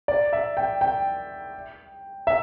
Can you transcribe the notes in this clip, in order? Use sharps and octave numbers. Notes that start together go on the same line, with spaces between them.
D5
E5
G5
G5
E5